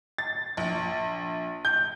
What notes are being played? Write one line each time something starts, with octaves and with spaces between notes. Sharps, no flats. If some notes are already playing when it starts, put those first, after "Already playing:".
A6
A#1
G6